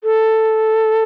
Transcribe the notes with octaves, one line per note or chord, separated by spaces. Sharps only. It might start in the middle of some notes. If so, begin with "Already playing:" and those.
A4